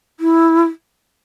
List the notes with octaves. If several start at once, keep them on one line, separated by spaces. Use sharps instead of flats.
E4